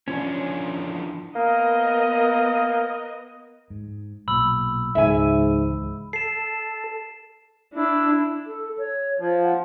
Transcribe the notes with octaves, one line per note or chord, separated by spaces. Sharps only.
E3 F3 C#4 D4
A#3 B3 A#4 D#5
G#2
B1 A#2 B5 E6
C#2 G#2 E3 E5 G#5
A4 C7 E7
D4 E4
A4
C#5
F3
F#5